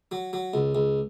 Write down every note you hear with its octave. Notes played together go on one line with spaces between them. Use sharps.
F#3
F#3
C#2
C#2